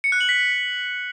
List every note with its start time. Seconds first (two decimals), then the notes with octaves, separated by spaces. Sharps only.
0.04 C#7
0.12 F#6
0.21 F#7
0.29 B6